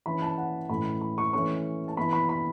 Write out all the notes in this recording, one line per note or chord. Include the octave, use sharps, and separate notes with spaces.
E3 C#4 B5
A5
F#5
A2 E3 C#4 B5
B5
C#6
E3 A3 C#4 C#6
A5
E3 B3 B5
B5
B5